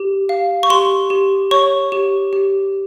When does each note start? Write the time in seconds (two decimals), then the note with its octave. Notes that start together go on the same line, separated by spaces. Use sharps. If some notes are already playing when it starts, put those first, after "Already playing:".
Already playing: G4
0.29 F5
0.63 C#6
0.70 G4 C6
1.10 G4
1.51 C#5 C#6
1.92 G4
2.33 G4